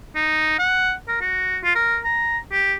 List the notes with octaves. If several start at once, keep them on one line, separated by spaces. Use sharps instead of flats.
D#4
F#5
A#4
F#4
F4
A#4
A#5
G4